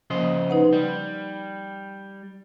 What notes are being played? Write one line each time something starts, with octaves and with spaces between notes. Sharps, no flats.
C#3 F3 A#3 C5 D#5
D#4 B4 F#5
G3